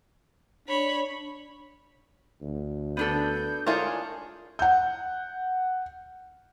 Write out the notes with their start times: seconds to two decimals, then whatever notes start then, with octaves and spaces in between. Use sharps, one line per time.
0.68 D4 C#5 B5
2.42 D2
2.97 B3 D4 A4 G6
3.66 D4 F4 G#4 A#4 C#5
4.59 F#5 G6